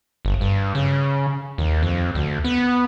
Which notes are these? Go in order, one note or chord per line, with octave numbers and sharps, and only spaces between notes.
G1
G2
C#3
D#2
F2
D2
B3